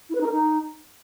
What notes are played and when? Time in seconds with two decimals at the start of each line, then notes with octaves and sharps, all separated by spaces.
0.09 E4
0.15 B4
0.20 D#4
0.26 A#4
0.32 D#4